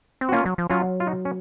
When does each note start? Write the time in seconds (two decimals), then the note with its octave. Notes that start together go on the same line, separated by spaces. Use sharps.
0.21 C4
0.29 F#4
0.32 A#3 C#4 F4
0.46 F#3
0.58 F3
0.70 F#3 C#4 F4
1.00 F4
1.07 D#4 F#4
1.25 C#4